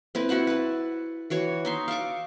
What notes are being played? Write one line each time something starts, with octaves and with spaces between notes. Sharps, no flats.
C4 E4 B4
E4 F#4 F#5 A5
B4 A5
E3 F#4 C#5
D#4 E5 C6
F5 A5 C#6 D6